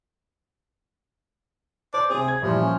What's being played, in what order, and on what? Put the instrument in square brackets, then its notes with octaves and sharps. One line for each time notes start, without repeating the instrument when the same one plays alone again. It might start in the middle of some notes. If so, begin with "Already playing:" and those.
[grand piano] C5 [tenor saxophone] D5
[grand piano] C3 C4 [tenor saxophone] G#4
[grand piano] G#6
[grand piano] A#2 E3 G3 [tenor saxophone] F3
[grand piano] C#4